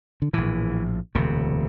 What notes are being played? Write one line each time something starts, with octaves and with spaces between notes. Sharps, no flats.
D3
A#1 A2 E3
E1 D2 C3